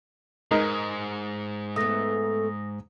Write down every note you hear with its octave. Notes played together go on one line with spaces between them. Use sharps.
G#2 G#3 D#4 A#4
A3 B3 D#6 A#6